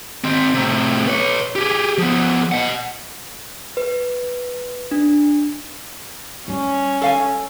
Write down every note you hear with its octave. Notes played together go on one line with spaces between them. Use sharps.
D#3 C4
A2 C3
B4 C#5
G4 G#4
F3 B3
D#5 F#5
B4
D4
G3 C#4
A4 F5 G#5